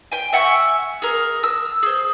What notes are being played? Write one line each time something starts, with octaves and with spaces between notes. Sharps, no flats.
G5 G#5
E5 F#5 G#5 C#6
G#4 A#4
E6
G#4 C5